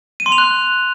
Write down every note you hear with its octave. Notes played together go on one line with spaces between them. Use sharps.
D#7
C6
F7
F#6